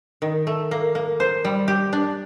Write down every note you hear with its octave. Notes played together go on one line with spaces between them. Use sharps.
D#3
A3
A#3
A#3
C5
G3
G4
D4